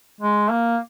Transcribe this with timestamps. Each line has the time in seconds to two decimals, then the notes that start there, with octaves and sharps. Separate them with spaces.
0.20 G#3
0.51 A#3